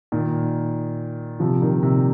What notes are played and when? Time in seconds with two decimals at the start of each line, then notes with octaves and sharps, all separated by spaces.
0.12 A#2 D#3
1.40 C3 F3
1.62 A#2 D#3
1.83 C3